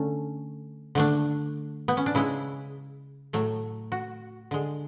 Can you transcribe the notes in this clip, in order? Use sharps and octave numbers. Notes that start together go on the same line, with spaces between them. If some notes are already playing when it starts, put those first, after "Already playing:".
Already playing: D3 A3 C#4
D3 A3 D4
B3
C#4
D4
C#3 G#3 E4
A2 F#3 A3
F#4
D3 G#3